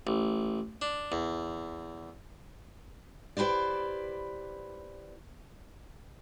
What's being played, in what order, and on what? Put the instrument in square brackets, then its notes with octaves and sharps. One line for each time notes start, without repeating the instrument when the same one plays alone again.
[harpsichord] A1
D4
E2
[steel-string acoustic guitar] E4 G4 B4 C5 D5